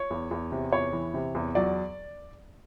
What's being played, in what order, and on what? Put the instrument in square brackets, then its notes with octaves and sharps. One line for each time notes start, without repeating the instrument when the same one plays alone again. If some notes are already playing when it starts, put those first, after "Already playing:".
Already playing: [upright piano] C#5
E2
E2
C3
E2 C#5
E3
C3
E2
F#3 D5